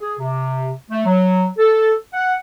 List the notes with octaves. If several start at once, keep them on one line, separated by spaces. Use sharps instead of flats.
G#4
C3
A3
F#3
A4
F#5